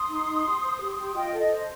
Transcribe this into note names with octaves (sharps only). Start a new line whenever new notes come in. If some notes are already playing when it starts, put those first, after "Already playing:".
Already playing: C6 D#6
D#4
D#4
G4
C5
G4
G4
F4 D#5 G5
A4
D#5
C5